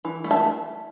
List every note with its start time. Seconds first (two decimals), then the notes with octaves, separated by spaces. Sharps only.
0.05 E3
0.24 A3
0.31 E5 A5